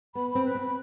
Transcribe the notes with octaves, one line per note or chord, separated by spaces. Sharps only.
B3 B5
B5
C4
B4
C4
B5